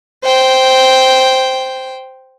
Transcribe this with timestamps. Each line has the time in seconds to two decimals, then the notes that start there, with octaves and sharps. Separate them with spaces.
0.24 C5 G5